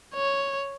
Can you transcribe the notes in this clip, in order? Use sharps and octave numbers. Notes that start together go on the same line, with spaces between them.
C#5